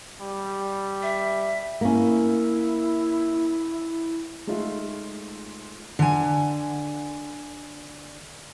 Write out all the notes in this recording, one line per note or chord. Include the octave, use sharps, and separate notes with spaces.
G3
E5
A#3 C#4 E4
G#3 A3 D#4 F4 E5
D3 G#5